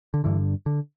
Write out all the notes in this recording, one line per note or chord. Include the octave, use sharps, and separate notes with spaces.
D3
G2 D3 E3
D3